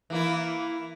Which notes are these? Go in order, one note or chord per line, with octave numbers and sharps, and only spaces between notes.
E3 A#3 E4